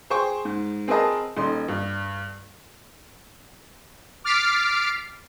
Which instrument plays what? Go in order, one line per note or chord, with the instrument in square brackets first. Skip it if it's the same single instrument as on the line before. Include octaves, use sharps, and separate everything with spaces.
[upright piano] G#4 C5 G5 C#6
G#2
C4 G#4 A#4 B4 D#5 A5
D#1 D#4 C6
G2
[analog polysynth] D6 F6 A6 B6 C7 D7